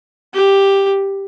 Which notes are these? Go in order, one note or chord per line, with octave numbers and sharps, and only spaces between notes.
G4